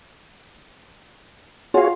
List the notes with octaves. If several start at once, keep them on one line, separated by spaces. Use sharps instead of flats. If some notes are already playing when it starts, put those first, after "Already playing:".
F4 F#4 G#4 C#5 F5